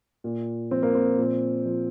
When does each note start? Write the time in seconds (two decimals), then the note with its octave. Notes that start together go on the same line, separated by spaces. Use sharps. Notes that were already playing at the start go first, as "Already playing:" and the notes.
0.24 A#2
0.71 F3 C4
0.83 A#3
0.95 C4
1.18 A#2
1.66 F3